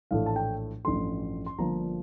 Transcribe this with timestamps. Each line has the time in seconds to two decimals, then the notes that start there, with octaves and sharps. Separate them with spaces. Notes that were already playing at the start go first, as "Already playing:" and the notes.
0.11 A#1 A2 E3 A3 F5
0.26 A5
0.36 G5
0.85 A1 G2 F3 A3 C6
1.46 C6
1.58 G1 G2 F3 A#3 A#5